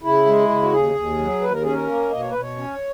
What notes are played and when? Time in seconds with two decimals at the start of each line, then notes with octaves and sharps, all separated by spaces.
0.03 C#3 E4
0.26 G#3
0.49 C#3
0.63 F#4
0.72 D#2 G#4
0.95 D#2
1.18 F#3
1.41 D#2 B4
1.52 A#4
1.63 C#4 G#4
1.74 A#4
1.87 A#3
2.11 B2 D#5
2.21 C#5
2.31 B2 B4
2.41 C#5
2.57 C#4